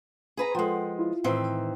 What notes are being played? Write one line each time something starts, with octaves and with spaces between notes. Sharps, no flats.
G#4 B4 A#5
F3 G#3 A4 F#5 G5
E4 F4
A2 D#3 E3 C4